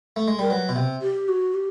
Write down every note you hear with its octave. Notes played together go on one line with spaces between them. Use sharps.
A3
G#3
G3 A#4
F#3 B4
B2
C3
G4
F#4
G4